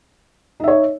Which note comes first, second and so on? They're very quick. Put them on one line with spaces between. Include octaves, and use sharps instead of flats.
D#4 E5 C#5